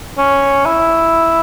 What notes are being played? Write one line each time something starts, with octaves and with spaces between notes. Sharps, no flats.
C#4
E4